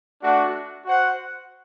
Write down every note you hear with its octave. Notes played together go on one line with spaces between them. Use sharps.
A3 D4 F#4
F#4 C5 F#5